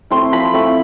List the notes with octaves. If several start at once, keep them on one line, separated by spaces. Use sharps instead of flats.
A3 C4 E4 C6
F3 B5
A3 C4 E4